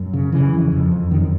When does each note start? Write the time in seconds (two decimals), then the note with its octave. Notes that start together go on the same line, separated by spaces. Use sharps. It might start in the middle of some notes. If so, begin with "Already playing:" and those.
Already playing: F#2
0.13 C#3
0.32 C#3 E3
0.53 F2
0.72 F2
0.92 F2
1.11 F#2 D#3